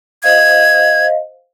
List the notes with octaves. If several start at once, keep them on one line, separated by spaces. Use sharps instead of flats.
C5 D#5 F5 G#6